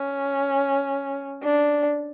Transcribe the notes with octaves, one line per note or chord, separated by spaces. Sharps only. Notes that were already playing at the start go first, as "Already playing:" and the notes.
Already playing: C#4
D4